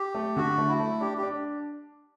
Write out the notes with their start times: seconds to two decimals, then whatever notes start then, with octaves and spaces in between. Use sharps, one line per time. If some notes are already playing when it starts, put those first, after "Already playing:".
Already playing: G4
0.15 A3
0.36 D3 F#4
0.58 A3
0.68 E4
0.80 A3
1.00 D4 G4
1.18 G4
1.23 D4